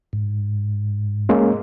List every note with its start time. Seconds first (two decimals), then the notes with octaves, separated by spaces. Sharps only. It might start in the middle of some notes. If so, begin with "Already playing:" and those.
0.13 G#2
1.29 G#3 A#3 C#4